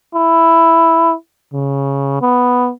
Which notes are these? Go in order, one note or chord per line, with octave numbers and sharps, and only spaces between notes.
E4
C#3
B3